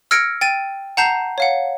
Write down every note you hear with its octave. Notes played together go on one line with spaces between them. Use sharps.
E6 F6 G#6 A#6 C#7 D7
G5 A6 D#7
F#5 A5 A#5 G6 C7 E7
C#5 F5 F#5